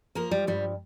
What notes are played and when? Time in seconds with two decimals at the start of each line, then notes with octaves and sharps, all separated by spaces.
0.15 F3 A#3 A#4
0.31 G3
0.47 G2 G3